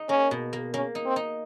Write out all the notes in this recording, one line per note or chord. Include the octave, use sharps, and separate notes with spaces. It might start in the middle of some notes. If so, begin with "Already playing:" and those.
Already playing: D#4
A#3 C#4
B2
A#3
A#3 C#4
D#4
C4
D#4